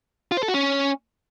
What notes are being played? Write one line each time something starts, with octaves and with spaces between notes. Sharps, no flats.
F4
C5
A4
F#4
C#4